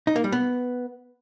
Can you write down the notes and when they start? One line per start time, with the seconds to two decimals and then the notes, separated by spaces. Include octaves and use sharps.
0.07 D#4
0.16 A#3
0.24 G3
0.32 B3